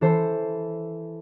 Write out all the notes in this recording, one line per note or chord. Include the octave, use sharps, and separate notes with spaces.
E3 A4 C5